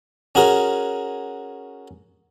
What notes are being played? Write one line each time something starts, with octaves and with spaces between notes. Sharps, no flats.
C#4 F#4 G#4 A#4